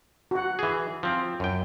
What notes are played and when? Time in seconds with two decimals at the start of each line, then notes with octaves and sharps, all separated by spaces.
0.31 F#4 F#5
0.59 E3 G#4
1.03 F3 C4
1.40 F#2 G5